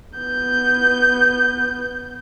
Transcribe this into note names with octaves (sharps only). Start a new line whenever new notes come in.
B3 G6